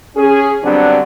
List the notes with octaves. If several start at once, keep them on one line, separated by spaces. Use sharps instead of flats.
C#4 G#4
D3 F#3 G3 B3 C4 D4